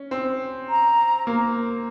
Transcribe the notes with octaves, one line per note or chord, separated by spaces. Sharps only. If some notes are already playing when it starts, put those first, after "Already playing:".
Already playing: C#4
C4
A#5
A#3